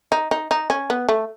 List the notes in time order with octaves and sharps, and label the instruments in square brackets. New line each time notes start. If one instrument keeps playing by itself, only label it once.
[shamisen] D#4
D#4
D#4
C#4
B3
A3